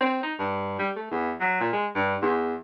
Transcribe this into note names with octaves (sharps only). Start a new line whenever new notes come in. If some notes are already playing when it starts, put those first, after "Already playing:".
C4
D#4
G2
G3
A3
E2
F#3
A#2
G#3
G2
E2